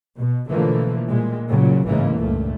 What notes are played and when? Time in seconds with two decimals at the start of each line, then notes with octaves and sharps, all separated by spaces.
0.17 B2
0.50 B2 D3 E3 F3 A3 A#3
1.09 A#2 G3 G#3
1.48 A#2 C#3 F#3
1.87 A1 G#2 C#3 E3 G#3 A#3
2.16 C#2 G2 A#2 A3